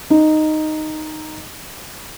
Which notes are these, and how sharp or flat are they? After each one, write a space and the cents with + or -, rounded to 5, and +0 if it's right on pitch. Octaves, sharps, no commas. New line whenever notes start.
D#4 -5